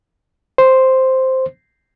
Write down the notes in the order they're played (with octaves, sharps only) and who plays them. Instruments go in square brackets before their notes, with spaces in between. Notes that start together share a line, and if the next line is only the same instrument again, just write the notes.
[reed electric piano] C5